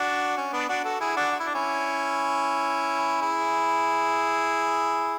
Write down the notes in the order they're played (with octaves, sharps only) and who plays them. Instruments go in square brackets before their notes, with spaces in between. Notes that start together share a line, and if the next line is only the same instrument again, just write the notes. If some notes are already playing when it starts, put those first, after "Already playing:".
Already playing: [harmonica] D4 F#4
C#4
B3 D4
D4 F#4
F#4 A4
E4 G#4
D4 F#4
F#4
E4
D4
C#4 E4
E4 G#4